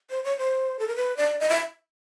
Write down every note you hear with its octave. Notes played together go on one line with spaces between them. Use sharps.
C5
C#5
C5
A4
A#4
B4
D5
D#5
E5